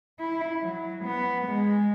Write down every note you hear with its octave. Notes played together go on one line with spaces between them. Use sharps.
E4
F#3
B3
G#3